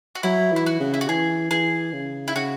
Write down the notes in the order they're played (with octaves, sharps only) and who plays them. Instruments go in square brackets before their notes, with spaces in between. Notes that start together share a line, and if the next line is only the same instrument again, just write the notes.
[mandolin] F#4
[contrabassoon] F#3 [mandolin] E4
[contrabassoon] E3 [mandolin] E4
[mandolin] F#4
[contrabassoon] C#3
[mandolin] E4
F#4
[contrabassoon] E3 [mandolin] G#4
[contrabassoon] E3 [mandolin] G#4
[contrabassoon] C#3
[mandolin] E4
[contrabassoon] C#3 [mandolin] F#4